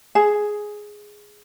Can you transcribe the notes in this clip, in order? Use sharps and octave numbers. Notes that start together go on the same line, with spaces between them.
G#4